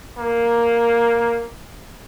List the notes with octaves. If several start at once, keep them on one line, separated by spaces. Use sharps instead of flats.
A#3